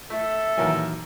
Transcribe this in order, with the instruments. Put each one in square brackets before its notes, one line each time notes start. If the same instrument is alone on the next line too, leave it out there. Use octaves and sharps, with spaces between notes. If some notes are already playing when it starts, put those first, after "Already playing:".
[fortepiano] A3 [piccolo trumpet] A4 [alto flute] E5
[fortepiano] D#2 A#4 G#5 [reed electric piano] A#2 E3 F#3